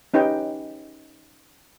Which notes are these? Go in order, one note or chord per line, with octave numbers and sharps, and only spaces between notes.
C#4 D#4 G4 B4 G5